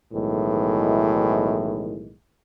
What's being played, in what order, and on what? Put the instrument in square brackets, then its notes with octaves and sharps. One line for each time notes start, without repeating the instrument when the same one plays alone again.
[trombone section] B1 A2 D#3 E3 G#3